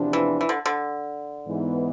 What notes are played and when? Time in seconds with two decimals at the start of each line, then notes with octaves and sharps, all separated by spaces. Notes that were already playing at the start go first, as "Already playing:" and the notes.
Already playing: E2 C3 F3 B3 D4
0.13 E3
0.41 E3
0.49 D3
0.66 D3
1.46 G#2 E3 B3